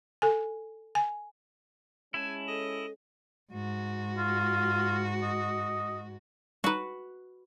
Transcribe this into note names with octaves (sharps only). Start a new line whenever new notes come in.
A4 G#5
G#5
G#3 C#4 E4 G#5 A5
A4 D#5
G#2 F#4
F4
D#5
G3 D#4 F#4 B4